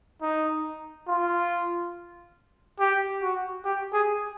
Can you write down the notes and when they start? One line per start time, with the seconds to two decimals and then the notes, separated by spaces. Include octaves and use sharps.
0.22 D#4
1.08 F4
2.79 G4
3.22 F#4
3.65 G4
3.93 G#4